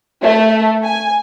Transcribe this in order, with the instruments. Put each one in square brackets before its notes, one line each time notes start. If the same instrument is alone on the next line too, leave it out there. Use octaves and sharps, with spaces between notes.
[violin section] A3
G#5